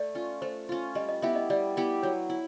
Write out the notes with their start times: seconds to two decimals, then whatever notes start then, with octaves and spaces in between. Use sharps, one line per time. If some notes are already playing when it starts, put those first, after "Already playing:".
Already playing: A3 D5
0.15 C#4 F4
0.42 A3 C5
0.69 C#4 F4
0.95 G3 D#5
1.09 D#5
1.22 B3 E4 G4 E5
1.36 D#5
1.50 G3 D5
1.77 B3 E4 G4
2.03 F#3 C#5
2.30 E4